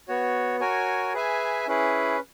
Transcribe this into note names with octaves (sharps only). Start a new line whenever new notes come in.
B3 F#4 C#5
F#4 A#4 C#5 G#5
G#4 B4 E5 G#5
C#4 E4 G#4 B4